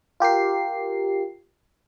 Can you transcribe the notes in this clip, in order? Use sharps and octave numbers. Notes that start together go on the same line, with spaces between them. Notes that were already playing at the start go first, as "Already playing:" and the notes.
F4 G4 A#4 C7